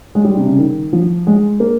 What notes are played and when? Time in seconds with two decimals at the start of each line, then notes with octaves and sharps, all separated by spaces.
0.15 G#3
0.25 G3
0.37 C3
0.48 C#3
0.59 D#3
0.93 F3
1.27 G#3
1.60 A#3